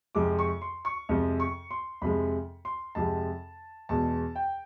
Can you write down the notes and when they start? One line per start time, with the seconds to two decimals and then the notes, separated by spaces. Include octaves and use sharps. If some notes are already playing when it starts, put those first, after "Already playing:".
0.15 F2 C3 F3 G#3 D6
0.39 C#6
0.62 C6
0.85 C#6
1.09 F2 C3 F3 G#3
1.40 C#6
1.71 C6
2.02 F2 C3 F3 G#3 B5
2.65 C6
2.95 F2 C3 F3 G#3 A5
3.89 E2 B2 G#3 A5
4.36 G5